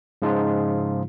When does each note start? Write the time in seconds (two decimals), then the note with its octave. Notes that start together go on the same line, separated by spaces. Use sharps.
0.22 G#2 C#3 F3 G#3 D#4 F4